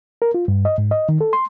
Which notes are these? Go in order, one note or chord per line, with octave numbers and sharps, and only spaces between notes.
A#4
F4
G2
D#5
G#2
D#5
D#3
A4
C6